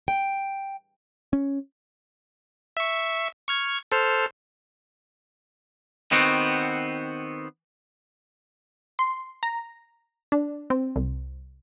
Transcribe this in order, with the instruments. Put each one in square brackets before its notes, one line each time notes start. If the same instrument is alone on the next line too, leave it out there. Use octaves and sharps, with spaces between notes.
[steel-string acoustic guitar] G5
[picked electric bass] C#4
[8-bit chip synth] E5 C#6
C#6 F6 G#6
A4 C5 F6
[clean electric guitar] D#3 B3 C4 F#4
[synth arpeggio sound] C6
A#5
D4
C4
C2